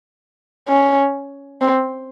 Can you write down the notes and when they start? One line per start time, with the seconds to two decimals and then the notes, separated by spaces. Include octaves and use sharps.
0.68 C#4
1.61 C4